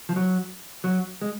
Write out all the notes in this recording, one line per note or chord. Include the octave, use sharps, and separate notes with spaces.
F3
F#3
F#3
G#3